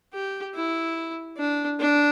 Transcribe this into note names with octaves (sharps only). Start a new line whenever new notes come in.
G4
E4
D4
D4